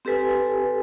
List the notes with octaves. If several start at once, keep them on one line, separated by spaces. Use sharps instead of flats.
C4 G4 A4 B4 G#5